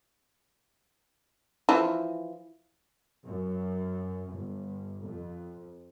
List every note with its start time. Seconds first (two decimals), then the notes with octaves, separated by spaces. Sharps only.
1.69 E3 F3
3.27 F#2
4.32 G1
5.05 F2